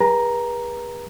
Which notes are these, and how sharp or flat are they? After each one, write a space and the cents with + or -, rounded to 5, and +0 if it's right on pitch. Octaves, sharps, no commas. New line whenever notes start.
G#4 -30 B4 -40 A#5 +0